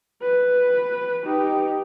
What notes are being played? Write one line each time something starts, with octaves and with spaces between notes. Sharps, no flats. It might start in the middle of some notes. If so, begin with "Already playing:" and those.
B4
D#4 G4